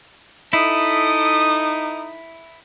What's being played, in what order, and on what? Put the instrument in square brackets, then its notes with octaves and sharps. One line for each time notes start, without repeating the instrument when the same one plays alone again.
[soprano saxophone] D#4 [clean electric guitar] E4 [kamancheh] A4 D#6